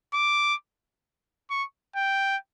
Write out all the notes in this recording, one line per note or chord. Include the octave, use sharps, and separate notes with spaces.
D6
C#6
G5